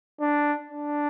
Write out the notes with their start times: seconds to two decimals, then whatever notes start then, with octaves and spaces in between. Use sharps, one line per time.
0.21 D4
0.70 D4